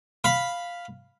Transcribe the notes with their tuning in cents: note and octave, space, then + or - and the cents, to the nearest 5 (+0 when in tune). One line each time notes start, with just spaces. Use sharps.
F5 +0 B5 +0